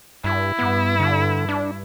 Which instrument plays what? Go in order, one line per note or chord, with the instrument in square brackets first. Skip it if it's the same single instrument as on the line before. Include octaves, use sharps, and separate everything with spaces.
[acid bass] G2 [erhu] E4
[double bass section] G2 [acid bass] B3
[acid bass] D3
D4